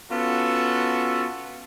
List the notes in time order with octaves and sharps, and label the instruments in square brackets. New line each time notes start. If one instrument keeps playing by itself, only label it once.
[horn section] B3 C#4 F4 F#4 A4